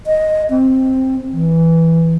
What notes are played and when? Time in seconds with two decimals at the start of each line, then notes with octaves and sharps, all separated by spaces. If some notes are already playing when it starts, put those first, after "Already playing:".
0.07 D#5
0.50 C4
1.32 E3